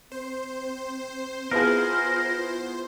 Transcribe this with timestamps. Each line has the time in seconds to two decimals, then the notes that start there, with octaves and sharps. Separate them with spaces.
0.12 C4 C5
1.51 B3 E4 F4 G#4 A#4